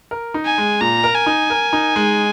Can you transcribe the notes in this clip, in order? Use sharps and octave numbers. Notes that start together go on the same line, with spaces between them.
A#4
D#4
G#5
G#3
A#2 A#5
A#4
G#5
D#4
A#4
D#4
G#3